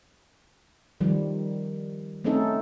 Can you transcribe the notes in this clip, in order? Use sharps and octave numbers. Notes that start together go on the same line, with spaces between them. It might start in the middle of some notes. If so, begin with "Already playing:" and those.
D#3 F3 G3
A3 C4 C#4 D#4 A4